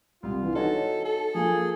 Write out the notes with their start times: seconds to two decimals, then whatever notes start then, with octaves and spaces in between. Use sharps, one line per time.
0.23 C2 F4
0.43 E3
0.55 D#4 F#4 A4 C#5
1.06 A4
1.34 F3 A#3 G#4